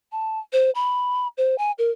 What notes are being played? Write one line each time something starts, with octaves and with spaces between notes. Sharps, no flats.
A5
C5
B5
C5
G#5
A#4